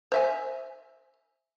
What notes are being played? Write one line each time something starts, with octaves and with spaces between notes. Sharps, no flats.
C5 E5 G#5